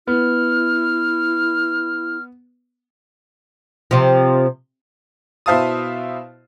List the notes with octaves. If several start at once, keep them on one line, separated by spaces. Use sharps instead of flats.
B3 E4 F6
C3 F3
B2 E4 C5 F5 A5 D#6